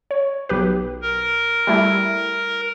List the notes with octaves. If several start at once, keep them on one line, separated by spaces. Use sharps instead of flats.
C#5
B1 G4 B4
A#4
G3 A3 E4